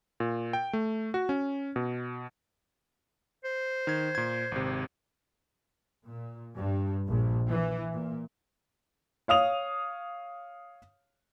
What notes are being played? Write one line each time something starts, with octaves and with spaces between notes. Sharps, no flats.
A#2
G5
A3
F#4
C#4
B2
C5
D#3 G#6
A#2 G#6
G#1 C3
A#2
G2
A#1
E3
A#2
C#5 F5 D#6 F7